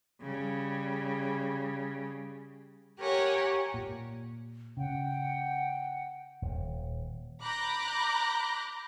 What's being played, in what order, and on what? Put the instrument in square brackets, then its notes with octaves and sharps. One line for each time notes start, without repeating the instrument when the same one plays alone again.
[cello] C#3 G3
[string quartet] G4 A#4 C#5 F#5 G#5
[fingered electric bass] A#2
[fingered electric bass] C#3 [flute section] F#5 G5
[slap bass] D#1
[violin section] A#5 B5 D6 F#6 G6 A#6